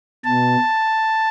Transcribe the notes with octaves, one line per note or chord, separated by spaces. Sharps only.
B2 A5